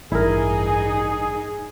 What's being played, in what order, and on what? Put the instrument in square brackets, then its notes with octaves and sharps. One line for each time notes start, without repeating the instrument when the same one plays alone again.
[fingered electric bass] A1 [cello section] G2 D#4 [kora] E4 A#4 [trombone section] G#4